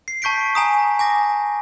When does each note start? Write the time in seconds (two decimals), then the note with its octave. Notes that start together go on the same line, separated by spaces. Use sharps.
0.08 C7
0.22 A5 C#6 G6 B6 D7
0.55 G#5 A#5 D#6
0.99 G#5 D6 A#6